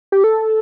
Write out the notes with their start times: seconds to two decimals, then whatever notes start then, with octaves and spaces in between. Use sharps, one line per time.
0.12 G4
0.24 A4